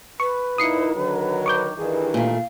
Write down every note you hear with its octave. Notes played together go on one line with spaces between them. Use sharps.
B4 C#6
A#2 D#4 E4 D#6 C7 C#7
D3 D#3 F#3
C#6 D6 G6
G2 D#3 E3 G#4
A#2 A3 F5